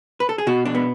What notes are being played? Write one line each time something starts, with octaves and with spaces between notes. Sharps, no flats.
B4
A4
G#4
B2 F#4
D4
B3